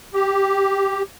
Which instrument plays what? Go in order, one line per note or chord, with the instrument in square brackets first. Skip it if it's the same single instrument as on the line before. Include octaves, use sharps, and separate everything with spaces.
[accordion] G4